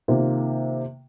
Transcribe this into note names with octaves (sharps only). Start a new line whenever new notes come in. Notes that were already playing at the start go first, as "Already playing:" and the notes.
C3 D#3 A#3 F4